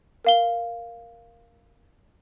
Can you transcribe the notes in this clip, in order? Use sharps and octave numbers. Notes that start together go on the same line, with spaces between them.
A#4 F5 G7